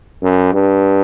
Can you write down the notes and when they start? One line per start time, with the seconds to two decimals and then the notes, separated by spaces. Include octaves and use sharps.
0.23 F#2
0.53 G2